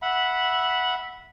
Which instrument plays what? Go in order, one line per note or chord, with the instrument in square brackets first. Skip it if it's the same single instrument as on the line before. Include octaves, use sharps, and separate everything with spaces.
[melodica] E5 F#5 B5